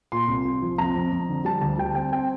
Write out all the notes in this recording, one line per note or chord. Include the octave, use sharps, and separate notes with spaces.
A#2 C6
C2
C2
F3
F2 A#5
F2
F2
D3
G3 A5
D2 A5
G3 G5
C4 G5
C4 G5